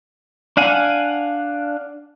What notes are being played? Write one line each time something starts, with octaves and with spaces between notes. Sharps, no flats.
D4 F5 F#5 G#5